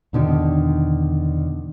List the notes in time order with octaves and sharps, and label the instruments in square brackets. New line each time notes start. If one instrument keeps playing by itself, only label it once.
[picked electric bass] E2 B2 D3 D#3